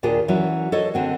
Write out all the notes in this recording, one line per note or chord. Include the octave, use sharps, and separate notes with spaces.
D#2 A#2 D4 F4 G#4 A#4
E3 F#3 C#4 E4
A4 C5 C#5 D#5
D3 C4 F#4